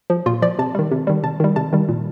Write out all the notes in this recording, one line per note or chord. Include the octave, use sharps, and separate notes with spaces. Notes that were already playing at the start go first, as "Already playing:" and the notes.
F3
A#2 F4
F3 D5
C3 A5
D#3 G3
C3
D#3 G3
C3 A5
D#3 G3
C3 A5
D#3 G3
A#2